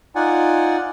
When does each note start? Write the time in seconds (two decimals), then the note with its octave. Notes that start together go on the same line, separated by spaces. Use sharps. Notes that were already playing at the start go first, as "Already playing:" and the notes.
0.15 D#4 F4 D5 F#5 G#5